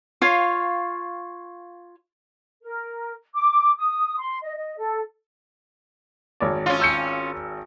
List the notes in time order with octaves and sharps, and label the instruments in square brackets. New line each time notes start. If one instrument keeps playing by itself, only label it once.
[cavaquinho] F4 C#5 F5
[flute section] A#4
D6
D#6
C6
D#5
D#5
A4
[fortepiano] G#1 C#5 D5
[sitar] C#4 F4
[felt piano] E6 G6 C#7